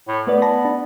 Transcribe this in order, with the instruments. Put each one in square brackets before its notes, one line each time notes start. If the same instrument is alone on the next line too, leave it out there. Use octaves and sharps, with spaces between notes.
[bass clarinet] A2
[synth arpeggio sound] A3 B4 D5 [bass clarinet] B3
[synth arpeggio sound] A5 B5 A#6
D4